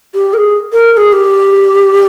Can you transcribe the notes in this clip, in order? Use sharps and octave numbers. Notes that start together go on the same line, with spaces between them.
G4
A#4
G#4
A#4
A#4
G#4
G4